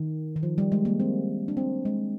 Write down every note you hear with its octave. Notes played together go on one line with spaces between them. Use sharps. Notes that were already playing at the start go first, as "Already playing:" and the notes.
Already playing: D#3
D#3
F3
G3
G#3
A#3
C4
D4
C4
G#3